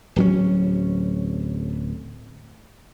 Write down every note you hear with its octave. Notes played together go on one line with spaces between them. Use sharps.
D1 F#3 C#4